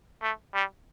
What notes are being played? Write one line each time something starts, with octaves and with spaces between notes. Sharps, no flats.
A3
G3